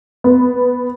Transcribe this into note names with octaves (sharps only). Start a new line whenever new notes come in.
B3